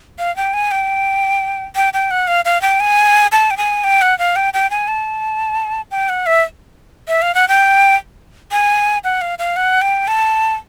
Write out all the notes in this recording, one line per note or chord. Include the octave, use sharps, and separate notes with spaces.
F5
G5
G#5
G5
G5
G5
F#5
F5
F5
G5
G#5
A5
G5
G#5
G5
F#5
F5
G5
G5
G#5
A5
G5
F#5
E5
E5
F5
F#5
G5
G#5
F#5
F5
F5
F#5
G5
A5